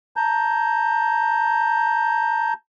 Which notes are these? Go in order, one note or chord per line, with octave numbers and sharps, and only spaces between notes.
A5 A#5 G6